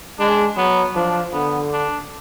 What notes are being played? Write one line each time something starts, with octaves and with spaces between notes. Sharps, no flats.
G#3 D4
F#3 B3
F3 D4
D3 B3
D4